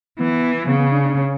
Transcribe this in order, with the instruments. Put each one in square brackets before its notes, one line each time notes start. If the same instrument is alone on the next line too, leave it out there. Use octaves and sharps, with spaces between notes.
[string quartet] E3 [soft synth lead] B3
[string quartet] C#3 [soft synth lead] B3
[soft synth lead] B3
D4
D4
C#4